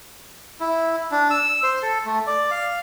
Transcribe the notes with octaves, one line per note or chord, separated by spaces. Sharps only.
E4
D4
E6
C5
A4
A3
D5
F5